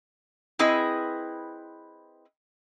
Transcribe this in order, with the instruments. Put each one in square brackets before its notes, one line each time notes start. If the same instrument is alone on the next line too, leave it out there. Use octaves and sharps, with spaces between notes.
[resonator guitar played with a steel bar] C4 E4 G#4 B4 D#5